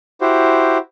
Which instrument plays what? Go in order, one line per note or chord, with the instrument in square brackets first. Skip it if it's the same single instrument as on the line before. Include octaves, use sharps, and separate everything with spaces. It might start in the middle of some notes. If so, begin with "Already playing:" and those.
[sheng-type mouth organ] E4 F#4 G4 C5